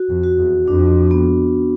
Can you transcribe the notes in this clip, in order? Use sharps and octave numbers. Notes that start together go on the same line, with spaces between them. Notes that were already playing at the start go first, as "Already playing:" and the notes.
Already playing: F#4
F2
F#4
E2
F2 D4
B3